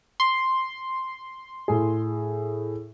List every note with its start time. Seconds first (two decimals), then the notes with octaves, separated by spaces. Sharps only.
0.20 C6
1.68 A2 G#4